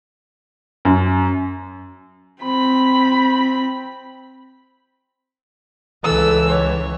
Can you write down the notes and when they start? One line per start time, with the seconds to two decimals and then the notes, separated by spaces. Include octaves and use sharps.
0.85 F#2
2.42 C4 B5
6.04 C#2 E3 A4 E6
6.49 C#5